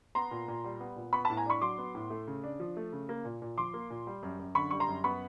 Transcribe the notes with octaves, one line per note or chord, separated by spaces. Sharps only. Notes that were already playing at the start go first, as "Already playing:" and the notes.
B3 A#5 C6
A#2
A#2
G3
B3
A#2
B3 B5 C#6
A5 B5
A2
G#5 A#5
D4 B5 C#6
F#3 C6 D6
B3
A2
A3
C#3
D4
F3
A3
C#3
A#3
A#2
A#2
F3 C6 D6
A#3
A#2
G3
F#2
F#2
D3 B5 C#6
G3 C#6
A#5 C6
F#2
B3 B5 C#6